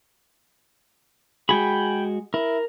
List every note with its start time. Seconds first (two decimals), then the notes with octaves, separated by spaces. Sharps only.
1.49 G#3 F#4 G#4 G5 G#5 B5
2.34 E4 A#4